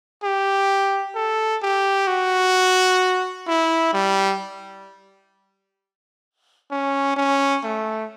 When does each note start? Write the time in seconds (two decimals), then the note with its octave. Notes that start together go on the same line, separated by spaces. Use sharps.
0.23 G4
1.15 A4
1.62 G4
2.07 F#4
3.47 E4
3.93 G3
6.71 C#4
7.16 C#4
7.63 A3